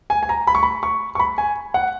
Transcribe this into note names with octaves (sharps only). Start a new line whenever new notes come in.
G#5
G#5
A#5
B5
C#6
B5
C#6
C#6
B5
G#5
F#5